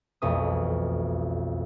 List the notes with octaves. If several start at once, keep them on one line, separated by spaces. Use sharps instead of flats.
E1 B1 F2 A3 D#6